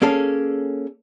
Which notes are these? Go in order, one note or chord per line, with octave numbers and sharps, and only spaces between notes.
A#3 C#4 G#4 A4